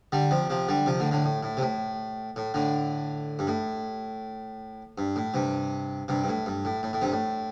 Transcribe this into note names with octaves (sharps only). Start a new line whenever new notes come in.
D3 G3
C3 F3
C3 F3
D3 G3
C3 F3
A2 D3
A2 D3
A2
A2
C3
A2
A2
A2 D3
G2
A2
G2
A2
G2 C3
G2 C3
G2
A2
G2
A2
A2
A2
G2 C3
A2